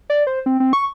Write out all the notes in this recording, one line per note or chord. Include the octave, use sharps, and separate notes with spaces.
D5
C5
C4
C4
C#6